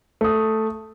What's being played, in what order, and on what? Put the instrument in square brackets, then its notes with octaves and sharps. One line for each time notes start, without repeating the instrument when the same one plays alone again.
[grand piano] A3 D#6